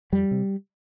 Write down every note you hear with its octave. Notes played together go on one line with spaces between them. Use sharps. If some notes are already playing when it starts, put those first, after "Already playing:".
F2 G3
C3